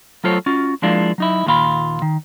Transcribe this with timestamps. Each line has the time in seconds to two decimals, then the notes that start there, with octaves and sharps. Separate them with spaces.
0.24 F#3 A3 F4 A4 C5 C#5
0.46 C#4 F4 F#4
0.82 F3 G#3 A#3 D4 E4 F4
1.18 F#3 D#4 E4
1.46 D#2 A#2 F4 B5
2.02 D#3